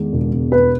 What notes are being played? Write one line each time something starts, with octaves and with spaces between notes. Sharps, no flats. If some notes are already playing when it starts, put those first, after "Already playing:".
Already playing: E2 D#3 G#3
E1
E1
E2 B4